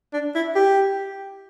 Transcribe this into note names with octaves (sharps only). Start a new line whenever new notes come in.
D4
E4
G4